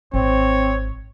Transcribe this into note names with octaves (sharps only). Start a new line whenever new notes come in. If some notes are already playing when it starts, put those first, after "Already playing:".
G#1 C4 C#5